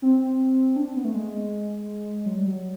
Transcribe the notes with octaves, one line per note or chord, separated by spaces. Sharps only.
C4
D4
B3
A3
G#3
F#3
G3
F#3